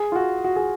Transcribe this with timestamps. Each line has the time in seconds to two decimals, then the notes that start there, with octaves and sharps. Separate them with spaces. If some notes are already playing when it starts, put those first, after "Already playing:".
Already playing: G#4
0.12 F4
0.16 F#4
0.44 F#4
0.56 G#4